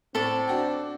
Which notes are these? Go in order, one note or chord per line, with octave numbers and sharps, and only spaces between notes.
A2 C4 A4 D5
D4 F#4 G5